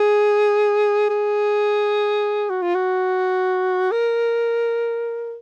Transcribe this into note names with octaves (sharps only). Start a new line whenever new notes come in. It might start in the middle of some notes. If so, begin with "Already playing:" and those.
Already playing: G#4
G#4
F#4
F4
F#4
A#4